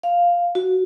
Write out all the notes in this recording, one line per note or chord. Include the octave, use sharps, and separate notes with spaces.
F5
F#4